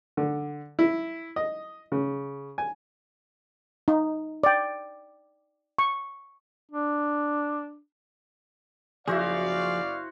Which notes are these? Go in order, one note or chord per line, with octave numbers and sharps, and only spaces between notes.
D3
E4
D#5
C#3
G#5
D#4
D5 G5
C#6
D4
F#1 F3 E4 F#4 G#4 C5 D5 F5